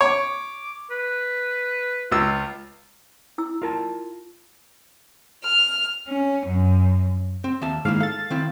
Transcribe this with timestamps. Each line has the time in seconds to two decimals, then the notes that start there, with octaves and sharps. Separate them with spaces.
0.01 C#5 D6
0.91 B4
2.12 C#2 F4 E6
3.38 E4 E6
3.62 F4 A#4 A5
5.44 F6
6.08 C#4
6.46 F#2
7.44 C4
7.62 D#2 E5 A5
7.85 G#2 D#3 A#3 E4 F5
8.00 A4 F5 A6
8.30 D#3 C4 E4